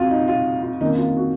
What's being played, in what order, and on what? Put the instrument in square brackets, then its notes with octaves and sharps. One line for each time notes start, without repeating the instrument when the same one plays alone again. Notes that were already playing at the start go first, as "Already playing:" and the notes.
Already playing: [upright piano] F2 F4 F#4
D#4
F4
F4
F2 D#3 A#3 C#4 D#4
F4
F#4